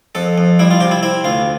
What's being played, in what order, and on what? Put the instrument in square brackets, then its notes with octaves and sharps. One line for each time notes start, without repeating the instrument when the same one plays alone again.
[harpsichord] F2 A4
F2
G3 E4
F4
C3 G4
E4
C4 E4
D2 F4